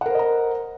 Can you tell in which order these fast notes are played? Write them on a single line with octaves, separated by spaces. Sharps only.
F#5 A#4 C5 D#5 A#5